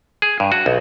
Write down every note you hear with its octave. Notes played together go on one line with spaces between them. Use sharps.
G#4
G2
F#4
B1